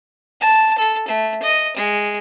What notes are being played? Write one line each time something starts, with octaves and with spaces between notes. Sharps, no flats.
A5
A4
A3
D#5
G#3